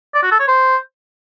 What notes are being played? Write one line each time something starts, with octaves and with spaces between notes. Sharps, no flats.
D5
F#4
A4
C#5
C5